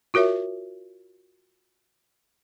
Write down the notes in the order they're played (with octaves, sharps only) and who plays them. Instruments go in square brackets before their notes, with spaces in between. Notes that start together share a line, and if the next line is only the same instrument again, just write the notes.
[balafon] F4 F#4 A#4 C#5 E5